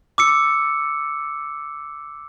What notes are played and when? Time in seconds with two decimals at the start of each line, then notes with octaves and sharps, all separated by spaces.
0.18 D6 E6 C#7